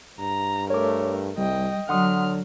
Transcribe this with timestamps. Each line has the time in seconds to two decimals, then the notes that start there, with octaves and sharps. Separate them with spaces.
0.20 G2 A#5
0.70 A3 A#4 C#5 D6
1.38 C2 G3 D#5 G5
1.89 D3 F#3 F#5 C6 D#6 F6